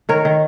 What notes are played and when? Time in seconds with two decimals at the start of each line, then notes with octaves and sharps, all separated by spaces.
0.09 D#3 A#4 C#5
0.25 D#3